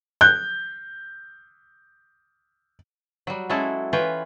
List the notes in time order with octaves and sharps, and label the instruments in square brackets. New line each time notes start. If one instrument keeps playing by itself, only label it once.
[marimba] F#6 [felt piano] G6
[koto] F#3 G3
F#3 G#3 C#4 E4 A4
E3 F4 B4 C#5 G5